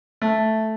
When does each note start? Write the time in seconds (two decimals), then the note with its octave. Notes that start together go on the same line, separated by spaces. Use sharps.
0.22 A3